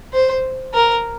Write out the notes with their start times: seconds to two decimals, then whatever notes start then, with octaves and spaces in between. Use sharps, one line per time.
0.13 C5
0.74 A#4